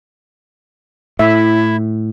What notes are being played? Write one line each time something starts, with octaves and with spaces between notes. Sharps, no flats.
A2 E4 E5